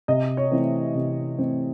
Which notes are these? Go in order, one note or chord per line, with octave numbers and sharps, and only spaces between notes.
C3 D#5
C#5
E3 A3 C4
C3
E3 A3 C4